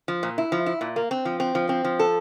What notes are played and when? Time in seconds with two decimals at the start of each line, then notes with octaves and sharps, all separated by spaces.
0.08 F3
0.23 A#2
0.38 E4
0.52 F3
0.66 E4
0.81 A#2
0.96 A#3
1.11 C4
1.25 F3
1.40 C4
1.55 F3
1.69 C4
1.85 F3
1.99 A4